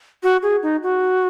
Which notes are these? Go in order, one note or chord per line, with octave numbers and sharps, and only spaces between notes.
F#4
G#4
D#4
F#4